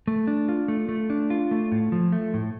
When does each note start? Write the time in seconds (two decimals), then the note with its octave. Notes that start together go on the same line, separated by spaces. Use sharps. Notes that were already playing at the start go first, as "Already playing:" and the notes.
0.08 A3
0.27 D4
0.49 F4
0.68 A3
0.89 A3
1.10 D4
1.30 F4
1.51 A3
1.72 A2
1.92 F3
2.12 A3
2.34 A2